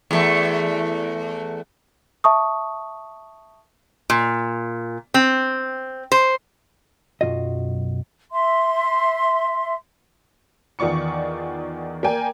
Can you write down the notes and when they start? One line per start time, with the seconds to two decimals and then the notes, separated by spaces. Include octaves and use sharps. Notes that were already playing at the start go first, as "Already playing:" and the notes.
0.11 E2 A3
2.24 E5 A5 C#6 D#6
4.10 A#2
5.14 C4
6.12 C5
7.21 B1 F#2 B2 F4 F#4 D#5
8.32 E5 C6
10.79 E2 D#3 F4 D5 C#6 C#7
12.03 A#3 A#4 D5 G5 G#5